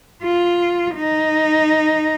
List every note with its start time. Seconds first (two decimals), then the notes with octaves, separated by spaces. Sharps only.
0.24 F4
0.96 D#4